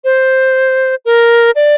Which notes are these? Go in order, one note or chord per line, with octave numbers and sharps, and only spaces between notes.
C5
A#4
D5